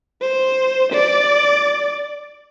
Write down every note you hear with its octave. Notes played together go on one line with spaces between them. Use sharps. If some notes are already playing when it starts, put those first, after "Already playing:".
C5
D5